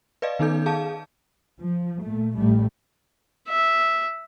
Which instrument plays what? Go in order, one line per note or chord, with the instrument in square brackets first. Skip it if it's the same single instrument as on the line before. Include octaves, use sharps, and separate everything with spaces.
[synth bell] B4 D5 D#5 F5
D#3 B3 D#4 A4 G6
G#4 F5 A5
[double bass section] F3
A#2 A3
A1 G3 A3
[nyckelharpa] E5